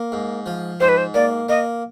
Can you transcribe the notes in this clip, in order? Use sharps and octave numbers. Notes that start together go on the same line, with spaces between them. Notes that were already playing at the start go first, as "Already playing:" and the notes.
Already playing: A#3
G#2
F3
G#2 C5
B4
C5
A#3 D5
A#3 D#5